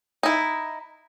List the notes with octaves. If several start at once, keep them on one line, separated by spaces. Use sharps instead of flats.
D#4 E4